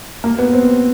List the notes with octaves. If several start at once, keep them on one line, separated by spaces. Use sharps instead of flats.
A#3
B3
C4